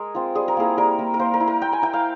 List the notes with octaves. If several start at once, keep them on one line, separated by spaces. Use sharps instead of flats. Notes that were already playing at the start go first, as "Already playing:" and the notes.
Already playing: G#3 G#4 A#4
C4 F4
G3 G#4
A#4
A#3 E4 G#4
G3 A#4
A#3 E4
A#4
A#3 C5
A#4
E4
A#4
A#3 G5
G#5
E4 G5
F5